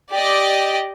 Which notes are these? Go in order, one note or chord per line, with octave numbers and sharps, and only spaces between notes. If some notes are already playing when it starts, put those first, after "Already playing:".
G4 D5 D#5